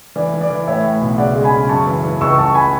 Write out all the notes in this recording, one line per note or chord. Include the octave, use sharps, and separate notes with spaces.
E3 D5
E3
D5
E3
A2 C#5 E5
A2
B1
C#3 D5 F#5
G#3
G#5 B5
C#3
F#2 A5 C#6
E3
E3
C#2 C#6 E6
C#2 A5 C#6
G#5 B5